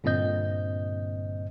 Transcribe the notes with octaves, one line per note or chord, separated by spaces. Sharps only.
G2 A#2 D3 C4 D#5 G6